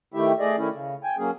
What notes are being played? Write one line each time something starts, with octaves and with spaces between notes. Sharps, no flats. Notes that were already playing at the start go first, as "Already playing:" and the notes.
D#3 A3 E4 G4 E5
A3 G#4 D5 D#5
D#3 A3 C#4 E4
C#3
G5 G#5
F#3 A#3 C#4 G#4